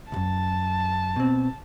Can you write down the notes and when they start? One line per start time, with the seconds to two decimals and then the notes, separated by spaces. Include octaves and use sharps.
0.12 C2 F#2 A5
1.16 B2 C4